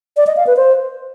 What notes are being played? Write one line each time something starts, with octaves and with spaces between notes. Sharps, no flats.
D5
D#5
F5
B4
C5